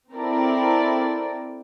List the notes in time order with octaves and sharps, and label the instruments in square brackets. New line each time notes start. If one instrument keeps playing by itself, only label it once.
[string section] C4 E4 A4 A#4 D5